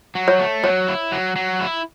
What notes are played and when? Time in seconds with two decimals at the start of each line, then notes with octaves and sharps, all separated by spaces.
0.15 F#3
0.28 C#5
0.39 A3
0.64 F#3 C#5
0.88 E4
1.12 F#3
1.36 F#3
1.61 E4